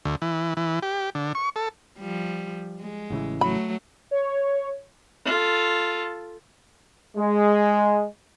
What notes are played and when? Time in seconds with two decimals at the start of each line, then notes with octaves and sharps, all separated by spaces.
0.05 D2
0.22 E3
0.57 E3
0.83 G4
1.15 D3
1.35 C#6
1.56 A4
1.99 F3 G3
2.81 G#3
3.10 A1 C#3 E3
3.41 F#3 A3 B5
4.11 C#5
5.25 F4 A4
7.17 G#3